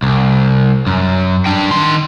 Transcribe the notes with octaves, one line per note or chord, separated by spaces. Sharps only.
C2
F#2
D4 G5
D#3 C6